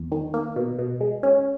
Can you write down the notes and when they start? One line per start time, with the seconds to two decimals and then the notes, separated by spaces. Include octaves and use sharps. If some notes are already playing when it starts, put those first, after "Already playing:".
Already playing: E2
0.12 D#3
0.34 A#3
0.56 B2
0.79 B2
1.01 G#3
1.23 C#4